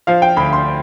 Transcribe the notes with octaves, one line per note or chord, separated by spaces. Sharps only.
F3 F5
G5
D2 B5
C6